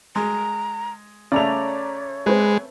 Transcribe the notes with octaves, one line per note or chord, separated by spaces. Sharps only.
G#3 A#5
C#3 A3 C#5 D5 A#5 F7
G#3 C4 B4